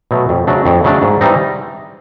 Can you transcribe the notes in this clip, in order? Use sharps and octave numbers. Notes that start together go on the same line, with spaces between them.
B2 F#3 A3
F2
C#3 F#3 A3 D4
F2
C#3 F#3 A3 D4
G#2
E3 G3 C4 D#4